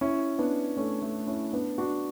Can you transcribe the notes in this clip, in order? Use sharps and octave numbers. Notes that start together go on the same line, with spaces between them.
C#4 E4
B3 D4
A3 C#4
A3 C#4
C#4 E4
B3 D4
D4 F#4